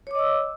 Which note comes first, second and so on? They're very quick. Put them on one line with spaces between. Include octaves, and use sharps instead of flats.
C#5 D6 D#5 E6